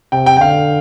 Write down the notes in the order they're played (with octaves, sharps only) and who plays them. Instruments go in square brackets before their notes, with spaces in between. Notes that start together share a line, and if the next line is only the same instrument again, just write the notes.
[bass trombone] C3 [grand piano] G5
[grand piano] G5
G5
[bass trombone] D3 [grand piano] F5